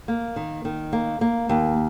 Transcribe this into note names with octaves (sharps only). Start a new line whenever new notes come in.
A#3
D#3
D#3
A#3
A#3
D#2